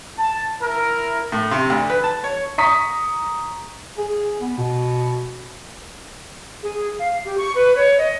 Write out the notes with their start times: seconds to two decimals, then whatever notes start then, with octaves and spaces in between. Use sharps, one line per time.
0.18 A5
0.62 E4 A#4
1.32 A2
1.51 C3
1.70 D2
1.90 B4
2.04 A5
2.24 C#5
2.58 A#5 C#6 D#6 B6
3.98 G#4
4.42 B3
4.58 B2
6.63 G#4
6.99 F5
7.25 G4
7.38 C#6
7.55 B4
7.76 C#5
7.98 D#5